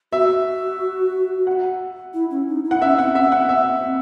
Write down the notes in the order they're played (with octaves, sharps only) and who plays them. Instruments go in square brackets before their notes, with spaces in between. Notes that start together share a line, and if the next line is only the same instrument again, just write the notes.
[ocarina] F#4 [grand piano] E5
[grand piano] F#5
[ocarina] E4
C#4
D#4
E4
[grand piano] F#5
[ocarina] C#4 [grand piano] E5
[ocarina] C4 [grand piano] F#5
[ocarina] C#4 [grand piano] E5
[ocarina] C4 [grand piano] F#5
[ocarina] C4 [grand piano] E5
[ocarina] C4